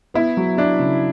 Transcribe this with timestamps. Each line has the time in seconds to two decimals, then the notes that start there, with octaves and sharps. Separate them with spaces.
0.14 B3 E4
0.37 F#3
0.57 D4 E4
0.79 C#3